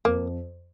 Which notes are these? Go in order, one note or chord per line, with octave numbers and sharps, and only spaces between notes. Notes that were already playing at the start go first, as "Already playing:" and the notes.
F2 A#3